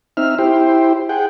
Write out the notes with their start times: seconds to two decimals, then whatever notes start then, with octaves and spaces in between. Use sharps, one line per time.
0.17 C4 D#4 E5 F6
0.38 E4 G4 C5
1.09 G#4 F#5 G5